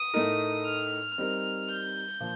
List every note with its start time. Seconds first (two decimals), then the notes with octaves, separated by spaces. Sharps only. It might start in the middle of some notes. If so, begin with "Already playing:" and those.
Already playing: D#6
0.14 A2 A3 D#4 A#4
0.66 F6
1.18 G3 C4 D#4 A#4
1.69 G6
2.20 A#2 F3